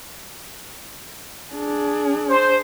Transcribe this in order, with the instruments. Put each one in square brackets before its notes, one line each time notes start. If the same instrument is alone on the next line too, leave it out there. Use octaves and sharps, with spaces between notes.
[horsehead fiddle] D4 G#4
[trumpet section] C5